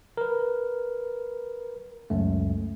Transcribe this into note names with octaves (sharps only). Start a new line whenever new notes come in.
A#4 B4
C#2 F#2 A3